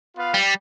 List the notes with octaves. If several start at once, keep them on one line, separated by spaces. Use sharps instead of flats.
B3 F4 B4 F5
G3